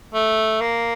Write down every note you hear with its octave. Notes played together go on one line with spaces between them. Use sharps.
A3
A#3